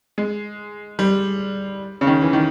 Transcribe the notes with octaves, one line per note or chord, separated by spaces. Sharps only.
G#3
G3
C#3
D#3
E3
D#3